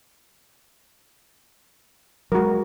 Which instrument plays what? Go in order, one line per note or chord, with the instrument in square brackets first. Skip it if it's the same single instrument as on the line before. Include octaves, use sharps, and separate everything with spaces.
[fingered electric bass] F#3 G#3 [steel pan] F#4 A#4